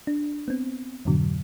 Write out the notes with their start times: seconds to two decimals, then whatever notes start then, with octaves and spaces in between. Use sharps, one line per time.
0.07 D4
0.48 B3 C4
1.05 F2 G#2 B2 D3 F#3